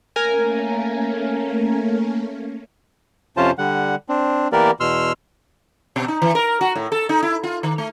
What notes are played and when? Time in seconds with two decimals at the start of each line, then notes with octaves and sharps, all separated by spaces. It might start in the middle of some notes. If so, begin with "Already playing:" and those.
0.16 A3 A#3 C#4 A#4 G#5
3.37 F2 C3 C#4 F4 C5 A5
3.58 D3 G3 F#5
4.09 C4 D4
4.52 E3 A#3 B3 G4 A#4 D5
4.80 E2 B2 C6 E6 F6
5.96 B2
6.08 D#4
6.22 E3
6.35 A#4
6.61 F#4
6.75 A2
6.92 A4
7.09 D#4
7.23 E4
7.43 F4
7.63 D#3
7.78 A3